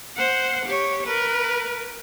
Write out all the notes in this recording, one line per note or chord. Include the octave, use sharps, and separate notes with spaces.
C5 F#5
G4 C#5
A#4 B4